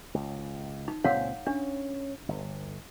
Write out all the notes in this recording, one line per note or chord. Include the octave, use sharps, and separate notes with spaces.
C#2
D#4
C#2 A#2 C4 C#5 F5 F#5
C#4 D4
G1